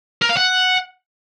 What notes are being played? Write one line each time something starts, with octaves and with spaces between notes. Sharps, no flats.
A#4
F5
F#5